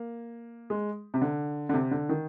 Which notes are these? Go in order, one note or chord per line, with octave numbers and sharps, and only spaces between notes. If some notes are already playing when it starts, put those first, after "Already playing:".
Already playing: A#3
G#3
C3
D3
D3
C3
D3
D#3